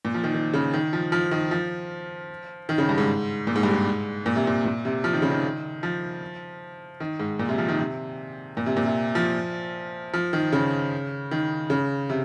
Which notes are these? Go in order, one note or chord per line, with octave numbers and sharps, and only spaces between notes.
A#2
F3
D#3
D#3
C#3
D#3
F3
F3
D#3
F3
D#3
C#3
G2
G#2
A#2
G#2
G2
G#2
A#2
C3
A#2
A#2
C3
F3
D#3
C#3
D#3
F3
D#3
G#2
A#2
C3
F3
D#3
C3
A#2
C3
A#2
C3
F3
F3
D#3
C#3
D#3
C#3
C3